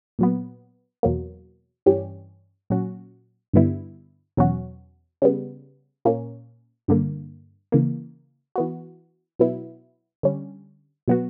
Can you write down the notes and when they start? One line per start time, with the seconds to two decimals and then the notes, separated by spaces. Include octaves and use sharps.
0.19 A#2 F#3 B3
1.03 E2 B2 F#3 A#3
1.86 G2 E3 G3 C#4 G4
2.70 A#2 F#3 C#4 F#4
3.53 G2 D3 G3 B3 E4
4.37 E2 B2 F#3 C#4 F#4
5.22 C#3 G3 B3
6.05 A#2 A#3 C#4
6.88 G2 D3 A#3
7.72 C#3 E3 A#3
8.56 E3 B3 F#4
9.39 B2 F#3 B3 E4
10.23 D3 G3 C#4
11.08 B2 F#3 B3 F#4